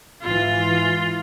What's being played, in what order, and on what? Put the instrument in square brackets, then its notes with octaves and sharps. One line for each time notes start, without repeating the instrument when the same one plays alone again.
[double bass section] G#2 E3 [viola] F4